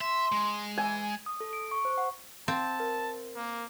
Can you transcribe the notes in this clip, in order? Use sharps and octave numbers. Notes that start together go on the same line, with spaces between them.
E5 C6
G#3
E3 G#5
D#6
A4
D7
C#6
C5
F#5
C4 F5 A5
A#4
A#3